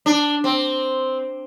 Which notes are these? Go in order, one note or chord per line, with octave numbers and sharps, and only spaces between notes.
D4
C4